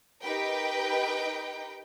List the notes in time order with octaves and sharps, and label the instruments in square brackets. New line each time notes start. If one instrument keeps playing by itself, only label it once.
[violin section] D#4 G4 A#4 B4 G5